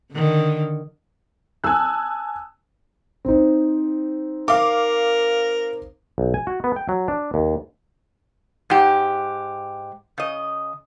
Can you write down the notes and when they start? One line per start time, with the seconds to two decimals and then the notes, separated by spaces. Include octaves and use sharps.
0.13 D3 D#3
1.64 G#5 A5 D#6 E6 F#6
3.25 C4 D#4
4.48 A#4 F5 D6
6.18 B1
6.34 G#5
6.47 F#4
6.64 B3
6.76 G5
6.89 F#3
7.08 D4
7.34 D#2
8.70 G#2 G4
10.18 C#3 D#5